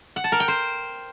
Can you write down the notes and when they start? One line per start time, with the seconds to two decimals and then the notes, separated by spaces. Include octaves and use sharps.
0.16 F#5
0.24 A5
0.32 A#4
0.40 G5
0.48 C5